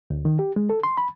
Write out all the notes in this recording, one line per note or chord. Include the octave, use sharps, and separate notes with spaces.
D2
D#3
G4
G#3
A4
C6
B5